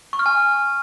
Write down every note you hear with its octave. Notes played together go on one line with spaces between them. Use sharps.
C#6
F6
G#5